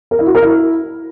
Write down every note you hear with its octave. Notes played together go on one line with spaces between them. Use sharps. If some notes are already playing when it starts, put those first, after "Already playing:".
A#4
E4
F#4
A#4
E4